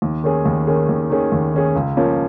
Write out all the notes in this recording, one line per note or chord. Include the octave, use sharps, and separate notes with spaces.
D#2
D#3 C#4 G#4
D#2
D#3 C#4 G#4
D#2
D#3 C#4 G#4
D#2
D#3 C#4 G#4
C#2
C#3 F3 A#3 C#4